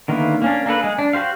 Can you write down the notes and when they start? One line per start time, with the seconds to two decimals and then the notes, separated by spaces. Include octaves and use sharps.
0.08 D3 D#3 A#3 B3 E4
0.42 A#3 C#4 D4
0.66 A#3 D4 A4 B4
0.81 G#3 G#4
0.99 D4
1.13 F#4 G4 C5 F5